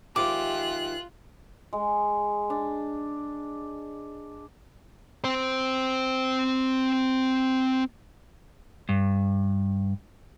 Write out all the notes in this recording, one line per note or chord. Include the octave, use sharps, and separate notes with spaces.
D#3 F3 G#3 F4 G4 E5 D6 F#6
G#3
D4
C4 C5
G2